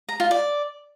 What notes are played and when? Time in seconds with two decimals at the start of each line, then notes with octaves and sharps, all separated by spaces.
0.09 A#5
0.20 F4
0.31 D5